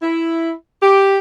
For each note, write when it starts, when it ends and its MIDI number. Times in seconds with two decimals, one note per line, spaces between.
0.01 0.51 64
0.82 1.18 67